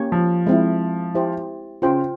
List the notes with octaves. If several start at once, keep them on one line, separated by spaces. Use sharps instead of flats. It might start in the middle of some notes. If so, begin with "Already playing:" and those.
Already playing: A#3 C#4 G4 C#5
F3
G#3 C4 E4
E4 G4 C5
C#3 F4 C5 G5